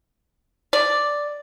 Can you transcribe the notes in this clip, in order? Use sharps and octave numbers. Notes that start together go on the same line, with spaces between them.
D5